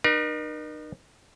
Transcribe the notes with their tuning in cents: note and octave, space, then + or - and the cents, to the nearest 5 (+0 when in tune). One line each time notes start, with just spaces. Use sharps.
D#4 -40 A#4 +40